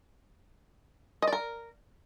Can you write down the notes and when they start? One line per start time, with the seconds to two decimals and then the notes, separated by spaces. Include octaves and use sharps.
1.22 D#5
1.27 D5
1.33 A#4